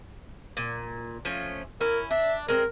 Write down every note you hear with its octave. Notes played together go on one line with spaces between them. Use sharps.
A#2
F3 A3 C#4
C#4 E4 A#4
D4 E5
G#3 C4 A#4